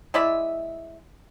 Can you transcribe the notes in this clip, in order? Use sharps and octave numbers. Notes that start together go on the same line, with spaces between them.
G#3 E4 D5 E5